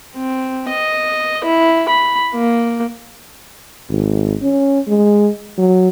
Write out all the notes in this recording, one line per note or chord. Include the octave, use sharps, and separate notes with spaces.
C4
D#5
E4
B5
A#3
G#1
C#4
G#3
F#3